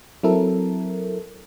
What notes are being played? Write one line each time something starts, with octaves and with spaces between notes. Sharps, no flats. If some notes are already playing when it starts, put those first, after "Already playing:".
F#3 C4 E4 A4 A#4